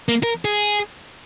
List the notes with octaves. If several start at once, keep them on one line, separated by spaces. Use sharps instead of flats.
A#3
A#4
G#4